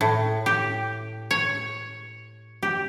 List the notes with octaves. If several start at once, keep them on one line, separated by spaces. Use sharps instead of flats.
A2
G4
C#5
G4